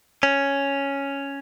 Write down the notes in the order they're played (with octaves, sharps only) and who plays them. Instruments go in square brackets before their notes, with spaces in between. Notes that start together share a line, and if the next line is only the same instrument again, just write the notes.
[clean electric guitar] C#4